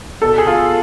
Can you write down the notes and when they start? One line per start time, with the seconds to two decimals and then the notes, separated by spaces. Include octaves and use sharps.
0.22 B2 A4
0.38 G#4
0.47 F4